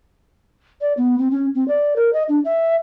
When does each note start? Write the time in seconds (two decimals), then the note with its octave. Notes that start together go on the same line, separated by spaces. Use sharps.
0.81 D5
0.97 B3
1.19 C4
1.31 C#4
1.55 C4
1.68 D5
1.96 A#4
2.13 D#5
2.29 D4
2.45 E5